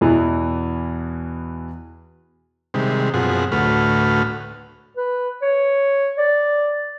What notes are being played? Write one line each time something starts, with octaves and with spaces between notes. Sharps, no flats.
E2 B2 E3
C3 D#3 G3 G#3
F#2 B2 F3 C4 G#4 F#5
D2 A2 A3 F#4 B4 F6
B4
C#5
D5